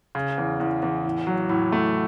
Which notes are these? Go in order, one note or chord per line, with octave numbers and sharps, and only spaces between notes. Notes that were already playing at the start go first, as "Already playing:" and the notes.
C#3
E2
E2
E2
A2
F#3
A2
A3